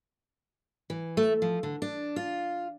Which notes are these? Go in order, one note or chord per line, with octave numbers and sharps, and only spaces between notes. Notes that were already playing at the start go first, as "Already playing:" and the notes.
E3
A3
F3
D3
D4
F4